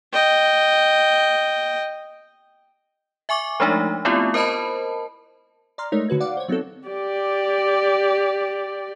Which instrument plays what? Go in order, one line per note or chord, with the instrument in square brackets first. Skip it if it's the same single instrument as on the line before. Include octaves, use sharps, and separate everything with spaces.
[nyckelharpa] D#5 G5
[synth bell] E5 G#5 C#6 D6
F3 G#3 A3 D4 D#4
A3 B3 C4 E4 F4 G4
A#4 C5 D#5 A5 B5
[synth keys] D5 A#5 C6 F6
G#3 A3 D#4 A#4 C#5
D3 F#4 B4 G#6
D5 F5 F#5 D6
C5 C#5
F#3 B3 C4 D#4 A4
[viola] G4 D5